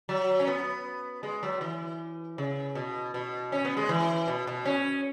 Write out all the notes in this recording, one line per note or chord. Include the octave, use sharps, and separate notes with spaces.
F#3
C#4
B3
G#3
F#3
E3
C#3
B2
B2
C#4
B3
G#3
E3
B2
B2
C#4